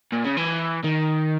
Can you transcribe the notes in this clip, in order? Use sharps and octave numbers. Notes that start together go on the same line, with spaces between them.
A#2
C#3
E3
D#3